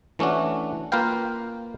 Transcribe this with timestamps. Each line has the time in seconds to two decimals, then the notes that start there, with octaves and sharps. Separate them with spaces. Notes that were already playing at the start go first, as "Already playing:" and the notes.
0.19 E3 A3 C#4 D4 F#4
0.92 A#3 F4 A#4 B4 F5 G5